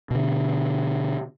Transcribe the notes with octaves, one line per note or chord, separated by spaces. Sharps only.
B2 D3